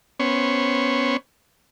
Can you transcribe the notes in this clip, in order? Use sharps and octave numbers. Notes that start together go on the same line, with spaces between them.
B3 C#4 C5 C#5